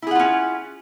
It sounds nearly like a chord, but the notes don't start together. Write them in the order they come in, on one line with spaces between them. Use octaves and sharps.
E4 G#4 F#5 F4 C#4